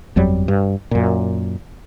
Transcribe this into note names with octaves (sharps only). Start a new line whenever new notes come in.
G1 F2 F#3 G3
G2
F#2 A#2